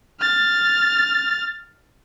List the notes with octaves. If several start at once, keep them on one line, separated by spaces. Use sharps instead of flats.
F6 A6